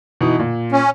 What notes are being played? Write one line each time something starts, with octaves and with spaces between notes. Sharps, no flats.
B2 E3 D#4
A#2
C#4